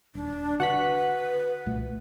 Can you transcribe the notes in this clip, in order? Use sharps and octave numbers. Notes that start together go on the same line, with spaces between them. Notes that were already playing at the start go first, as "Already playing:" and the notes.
D#1 D4
D3 F#4 B4 F#5 F#6 B6
C2 A#2 A3